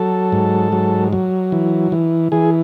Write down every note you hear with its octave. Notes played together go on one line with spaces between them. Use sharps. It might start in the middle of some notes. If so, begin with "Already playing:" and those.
Already playing: F#3 A4
G#2
F#3
F#3
E3
E3
E3 G#4